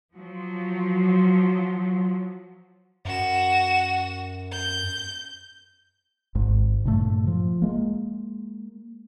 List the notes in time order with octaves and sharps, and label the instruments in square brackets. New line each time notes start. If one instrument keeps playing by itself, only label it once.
[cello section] F3 F#3
[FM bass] F#2 [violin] F#4 E7
[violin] G6
[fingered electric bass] G#1 G#2
G2 A#2 C#3 A3
F3
G#3 A#3